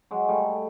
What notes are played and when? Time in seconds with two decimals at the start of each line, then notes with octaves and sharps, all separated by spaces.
0.11 F#3 G#3
0.28 G3 A3